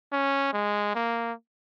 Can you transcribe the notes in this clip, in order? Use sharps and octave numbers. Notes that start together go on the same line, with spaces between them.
C#4
G#3
A#3